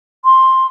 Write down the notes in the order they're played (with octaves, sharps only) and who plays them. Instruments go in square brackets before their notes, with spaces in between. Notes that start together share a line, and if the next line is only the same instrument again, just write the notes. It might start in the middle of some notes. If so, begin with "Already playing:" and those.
[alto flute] C6